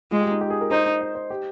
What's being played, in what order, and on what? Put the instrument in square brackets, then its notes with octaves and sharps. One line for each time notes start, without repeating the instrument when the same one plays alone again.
[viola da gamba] G#3 [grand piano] F4
[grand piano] G4
D#4
G4
G#4
A#4
[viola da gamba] D#4 [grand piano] C5
[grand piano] D#5
C5
G4